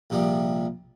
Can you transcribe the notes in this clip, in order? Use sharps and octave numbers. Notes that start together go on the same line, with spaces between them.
A#1 C3 F3 G3